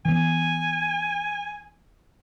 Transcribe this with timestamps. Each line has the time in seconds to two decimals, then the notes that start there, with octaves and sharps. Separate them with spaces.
0.05 E3 B3 G#5